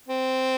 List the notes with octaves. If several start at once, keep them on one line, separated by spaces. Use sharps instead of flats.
C4